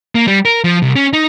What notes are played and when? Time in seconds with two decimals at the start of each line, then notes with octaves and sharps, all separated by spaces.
0.15 A#3
0.28 G3
0.45 A#4
0.64 F3
0.82 C2
0.96 C#4
1.13 D#4